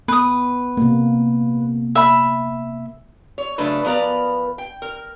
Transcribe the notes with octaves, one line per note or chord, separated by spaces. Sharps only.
B3 B4 D#6
C3 A#3
E5 B5
C#5
C#3 F#3 A3 D4 B4
F3 B3 A#4 B4 D5
G5
A#4